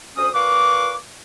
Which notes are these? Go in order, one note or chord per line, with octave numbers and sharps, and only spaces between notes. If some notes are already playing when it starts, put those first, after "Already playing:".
D2 C#4 C5 D#6
A#2 B4 F5 C#6 D6